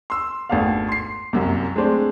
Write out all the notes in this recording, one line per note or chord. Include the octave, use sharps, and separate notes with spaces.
C6 E6
G#1 A3 B3 D4 F5
C6 C7
C2 F#2 C3
G#3 A3 C4 D4